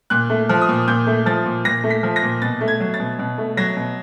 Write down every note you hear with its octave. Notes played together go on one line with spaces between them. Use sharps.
A#2 F#6
A3
F3
D#6
A#2
A#2 G6
A3
F3 A6
A#2
A#2 A#6
A3
B6
F3
A#6
A#2
B2 A6
A3
G#6
F#3
A6
B2
B2
A3
F#3 A#6
B2